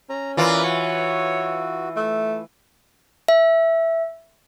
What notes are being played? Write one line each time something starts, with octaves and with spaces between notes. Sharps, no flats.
C#4 A#5
E3 F4 A#4 B4 D5
F#4 C#5
A3
E5